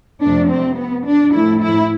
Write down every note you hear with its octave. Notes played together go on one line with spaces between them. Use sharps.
F2 C3 F3 A3 D4
C4
B3
D4
A2 F3 A3 E4
E4